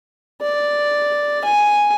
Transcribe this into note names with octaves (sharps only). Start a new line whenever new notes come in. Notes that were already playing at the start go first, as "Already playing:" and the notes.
D5
G#5